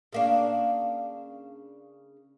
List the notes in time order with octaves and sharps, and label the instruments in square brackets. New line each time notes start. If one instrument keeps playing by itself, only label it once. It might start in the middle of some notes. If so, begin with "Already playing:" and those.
[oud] C#3 A#3 D4